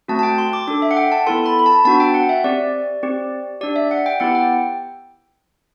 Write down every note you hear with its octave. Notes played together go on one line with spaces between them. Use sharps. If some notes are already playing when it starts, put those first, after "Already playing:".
A3 C4 F#4 A5
A5
G5
C6
D6
D4 A4 D6
E5
F#5
G5
A5
B3 E4 A4 C6
B5
B5
A5
B3 D4 F#4 A5
G5
F#5
E5
C4 G4 D5
C4 G4
D4 G4 D5
E5
F#5
G5
B3 E4 G4 F#5
G5